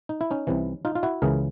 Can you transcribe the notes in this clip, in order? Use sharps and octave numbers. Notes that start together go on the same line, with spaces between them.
D#4
E4
C#4 D#4
C2 C3 E3
D#4 F4
F4
E4 F#4
C#2 C#3 E3 G#4 A#4